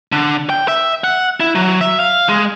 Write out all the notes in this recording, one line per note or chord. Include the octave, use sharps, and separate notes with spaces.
D3
G5
E5
F#5
E4
F#3
E5
F5
G#3